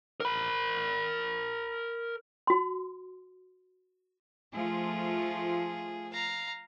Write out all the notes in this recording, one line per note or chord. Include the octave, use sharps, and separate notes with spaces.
A#4 B5
F#4 C6
F3 A3 F4 G#4
F5 A#5